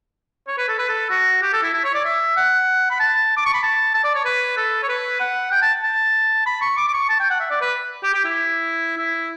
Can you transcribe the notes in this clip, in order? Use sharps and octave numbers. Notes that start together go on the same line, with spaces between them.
C#5
B4
A4
B4
A4
F#4
G4
A4
E4
E4
C#5
D5
E5
F#5
B5
A5
D6
C#6
B5
A5
A5
D5
C#5
B4
A4
C#5
B4
F#5
G5
A5
A5
B5
C#6
D6
D6
C#6
A5
G5
F#5
E5
D5
B4
G4
G4
E4
E4